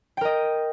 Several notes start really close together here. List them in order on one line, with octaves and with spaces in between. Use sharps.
G5 A#4 D#5